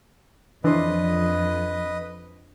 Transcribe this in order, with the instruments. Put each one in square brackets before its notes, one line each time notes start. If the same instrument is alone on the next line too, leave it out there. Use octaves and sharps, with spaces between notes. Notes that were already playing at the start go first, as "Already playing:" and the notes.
[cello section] F2 [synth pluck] E3 [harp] D4 C5 [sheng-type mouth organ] B4 D#5